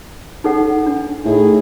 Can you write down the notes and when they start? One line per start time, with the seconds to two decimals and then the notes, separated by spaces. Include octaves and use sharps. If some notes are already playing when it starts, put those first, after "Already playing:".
0.44 D#4 A4 F#5
0.86 D4
1.25 A2 D#4 E4 G#4